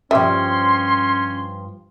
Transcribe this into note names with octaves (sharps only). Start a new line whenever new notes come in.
G2 F3 G3 C#4 E5 C6